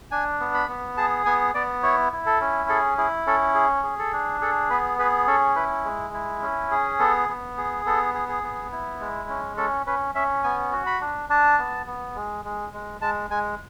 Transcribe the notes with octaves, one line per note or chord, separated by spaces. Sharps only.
D4 G#5
B3
B5
B3
G#4 A5
B3 G#5
B3 D5
E4 C#5
E4
A4
C#4
G#4 A4
E4 G#4
C#4 A4
G#4
G#4
A4
D4
G#4 A4
B3 B4
G#4 B4
C#4 A4
E4 B4
G#3
E4
C#4
G#4
B3 A4
B3
G#4
B3 A4
G#4
G#4
B3
E4
G#3
C#4
C#4 A4
C#4 B4
C#4 E5
B3 G#5
F#4
B5
D4
D4 A5
B3
B3
G#3
G#3
G#3
G#3 A5
G#3 G#5